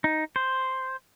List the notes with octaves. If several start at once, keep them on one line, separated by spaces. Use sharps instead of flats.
D#4
C5